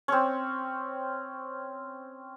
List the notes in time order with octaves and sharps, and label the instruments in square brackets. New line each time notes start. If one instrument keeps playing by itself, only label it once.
[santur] C4 C#4